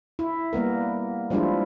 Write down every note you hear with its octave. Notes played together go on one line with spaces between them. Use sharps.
E4
G3 A#3 B3 A#4
F3 G3 G#3 D4 E4 F4